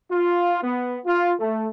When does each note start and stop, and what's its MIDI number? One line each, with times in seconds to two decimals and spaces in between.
0.10 0.59 65
0.63 0.99 59
1.06 1.34 65
1.40 1.67 57